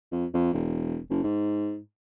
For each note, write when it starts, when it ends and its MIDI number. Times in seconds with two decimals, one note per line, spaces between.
0.12 0.25 41
0.34 0.52 41
0.53 0.99 28
1.10 1.24 30
1.24 1.78 44